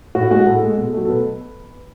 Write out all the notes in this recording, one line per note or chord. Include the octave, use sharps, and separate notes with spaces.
A2 F#4
G#3 F#4
A2 A4
G#3
B2
F#3 A3
A4
B2 B4